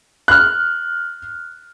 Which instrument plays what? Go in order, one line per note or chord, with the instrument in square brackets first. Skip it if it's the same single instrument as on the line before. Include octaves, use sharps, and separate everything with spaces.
[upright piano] F6 F#6